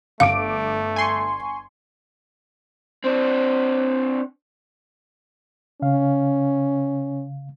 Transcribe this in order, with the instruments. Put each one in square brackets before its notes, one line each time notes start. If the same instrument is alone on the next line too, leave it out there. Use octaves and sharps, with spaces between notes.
[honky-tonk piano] G1 D6 D7 [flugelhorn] A3 [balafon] F5
[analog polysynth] G#5 C6 C#6
[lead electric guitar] C4 D4
[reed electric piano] C#3 F5 [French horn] C#4